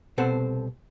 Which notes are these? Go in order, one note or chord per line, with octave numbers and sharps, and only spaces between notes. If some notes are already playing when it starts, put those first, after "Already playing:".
C2 B2 C4 A4 C5 F#5